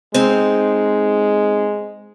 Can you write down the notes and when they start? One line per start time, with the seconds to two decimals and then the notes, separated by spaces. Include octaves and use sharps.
0.14 G#3 C4 D#4